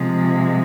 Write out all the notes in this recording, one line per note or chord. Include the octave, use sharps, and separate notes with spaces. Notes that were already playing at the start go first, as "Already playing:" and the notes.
Already playing: C3 F3 G#3